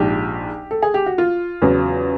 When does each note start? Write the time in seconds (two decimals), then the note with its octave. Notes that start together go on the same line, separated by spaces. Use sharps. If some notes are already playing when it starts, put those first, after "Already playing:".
Already playing: A#1 G#2 F3 G4
0.71 A4
0.82 G#4
0.94 G4
1.06 F#4
1.18 F4
1.62 E2 C#3 F#3